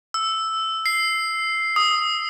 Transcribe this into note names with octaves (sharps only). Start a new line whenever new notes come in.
E6
C7
D#6